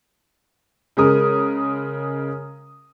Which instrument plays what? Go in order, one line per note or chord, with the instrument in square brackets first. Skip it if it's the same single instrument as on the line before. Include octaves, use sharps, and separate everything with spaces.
[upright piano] C#3 G#3 A#4 D#6